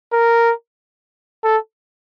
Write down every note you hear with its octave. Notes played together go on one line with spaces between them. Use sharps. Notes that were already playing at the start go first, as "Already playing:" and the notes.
A#4
A4